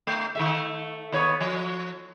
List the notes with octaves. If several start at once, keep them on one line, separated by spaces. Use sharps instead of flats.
A3
D#3 A3 E5
D#2 B3 C#5
F3